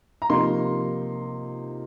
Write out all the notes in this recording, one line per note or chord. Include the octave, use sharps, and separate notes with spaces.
A#5
C3 F3 A#3 D#4 C6